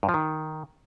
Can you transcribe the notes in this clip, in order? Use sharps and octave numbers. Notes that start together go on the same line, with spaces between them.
G2
F3
D#3